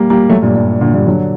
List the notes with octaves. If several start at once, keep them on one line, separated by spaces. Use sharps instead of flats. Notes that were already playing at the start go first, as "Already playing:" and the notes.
Already playing: G3 A#3
G3 A#3
F#3 A3
G2 A#2
G2
A#2 D3
G2 A#2
D3 F#3